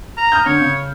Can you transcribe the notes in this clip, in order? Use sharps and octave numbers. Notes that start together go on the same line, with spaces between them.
A#5
D#6 F6 G6
D3 C#5
C#3